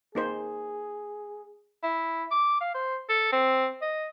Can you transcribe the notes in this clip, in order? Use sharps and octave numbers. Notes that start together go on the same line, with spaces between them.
A#3 D#4 G#4 C5
E4
D6
F5
C5
A4
C4
D#5